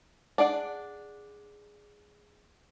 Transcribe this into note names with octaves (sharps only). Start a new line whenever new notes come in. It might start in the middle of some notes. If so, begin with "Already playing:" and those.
D4 G#4 D5 F#5